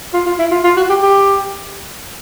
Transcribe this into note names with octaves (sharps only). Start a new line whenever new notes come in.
F4
F4
E4
F4
F4
F#4
G4
G4